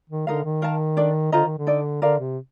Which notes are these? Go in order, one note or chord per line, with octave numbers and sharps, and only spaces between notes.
D#3
D3 D#4 A#4 F5
D#3
A#4 F5 A5
D4 A4 D5
D3 F4 C5 D#5 A#5
D#3
D3
D#4 A4 D5
D3 A#4 D5 F5
C3